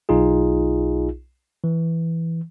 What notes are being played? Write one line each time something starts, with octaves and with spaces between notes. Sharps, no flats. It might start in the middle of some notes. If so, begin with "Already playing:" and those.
B1 D#4 F4 G#4
E3